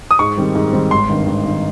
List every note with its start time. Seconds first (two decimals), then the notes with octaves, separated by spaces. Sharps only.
0.11 D#6
0.19 G#2 C#6
0.37 D#3 G3 C4
0.55 G#2
0.73 D#3 G3 C4
0.91 G#1 C6
1.09 G2 D#3
1.27 G#1
1.45 G2 D#3